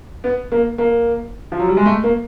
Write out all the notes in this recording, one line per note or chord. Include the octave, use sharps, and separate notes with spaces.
B3
A#3
A#3
F3
F#3
G3
G#3
A3
A#3